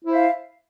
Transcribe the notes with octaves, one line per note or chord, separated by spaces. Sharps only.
E4 C5 E5 F5